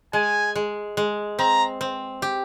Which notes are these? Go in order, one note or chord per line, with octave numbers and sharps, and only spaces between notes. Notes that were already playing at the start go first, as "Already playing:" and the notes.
G#3 G#5
G#3
G#3
C4 A#5
C4
G4